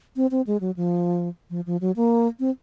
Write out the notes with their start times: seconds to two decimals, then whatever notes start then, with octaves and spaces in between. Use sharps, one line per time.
0.16 C4
0.31 C4
0.47 G#3
0.61 F#3
0.76 F3
1.50 F3
1.66 F3
1.81 F#3
1.96 A#3
2.40 C4